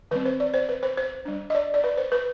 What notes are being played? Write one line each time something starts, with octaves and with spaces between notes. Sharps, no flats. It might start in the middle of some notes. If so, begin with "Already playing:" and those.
D#3 G3 C4 B4
C5
D5
C5
B4
C5
C5
G3 D4
D#5
D5
D5
B4
C5
B4